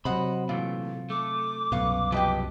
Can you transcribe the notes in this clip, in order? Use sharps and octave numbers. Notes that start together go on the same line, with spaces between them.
C3 F#3 C5 D#5 F#5 B5
A#2 E3 A3 F4
A3 D6
C2 F#2 B2 B4 F5 C#6
F3 F#3 G4 B4 D#5 G5